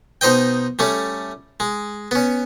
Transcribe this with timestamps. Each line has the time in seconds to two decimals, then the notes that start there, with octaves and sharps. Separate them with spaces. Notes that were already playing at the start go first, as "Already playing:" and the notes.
0.21 B2 D#4 C5 D#5 G5
0.79 G3 A3 C#4
1.60 G#3
2.11 B3 C#4